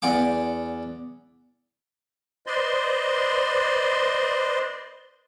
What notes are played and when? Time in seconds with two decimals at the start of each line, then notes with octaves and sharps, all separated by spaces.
0.02 E2 D5 F#5 G#5 D6
2.46 B4 C5 D5 D#5 C6